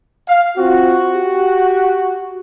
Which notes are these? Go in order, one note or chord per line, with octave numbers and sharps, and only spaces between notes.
F5
C4 F4 F#4
G4